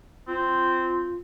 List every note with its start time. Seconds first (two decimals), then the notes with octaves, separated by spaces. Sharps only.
0.28 C4 F4